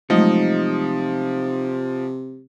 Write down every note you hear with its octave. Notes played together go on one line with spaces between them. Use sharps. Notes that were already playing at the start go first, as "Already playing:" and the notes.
C3 F3 F#3 G#3 A3 D#4 D#5